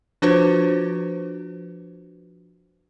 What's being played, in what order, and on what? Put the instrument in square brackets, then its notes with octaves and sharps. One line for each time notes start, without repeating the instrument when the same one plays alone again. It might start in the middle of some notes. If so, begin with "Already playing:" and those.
[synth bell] F3 D4 F4 F#4 B4 C5